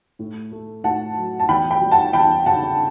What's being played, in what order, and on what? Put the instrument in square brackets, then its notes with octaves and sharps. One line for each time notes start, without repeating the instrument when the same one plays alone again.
[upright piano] A2
A3
A2 F#5 A5
F#3
A5
E2 G5 B5
G5 B5
G3
F#5 A5
E2 G5 B5
C#3 F#5 A5